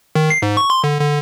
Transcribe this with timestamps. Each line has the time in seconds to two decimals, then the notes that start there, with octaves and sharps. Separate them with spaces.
0.15 D#3
0.30 C7
0.42 G#2
0.57 C#6
0.70 C6
0.84 D3
1.00 D3